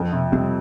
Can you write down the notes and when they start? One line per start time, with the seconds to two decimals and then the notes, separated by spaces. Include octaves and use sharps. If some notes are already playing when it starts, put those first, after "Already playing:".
Already playing: F2
0.12 C3
0.32 G3 C4